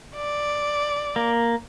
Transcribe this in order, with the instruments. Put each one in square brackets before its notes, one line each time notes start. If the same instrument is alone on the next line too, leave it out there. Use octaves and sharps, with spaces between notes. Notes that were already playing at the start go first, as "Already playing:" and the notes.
[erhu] D5
[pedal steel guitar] A#3